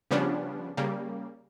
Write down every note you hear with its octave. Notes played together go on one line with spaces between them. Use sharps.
C#3 F3 G3 B3 C#4 D4
C#3 G3 A#3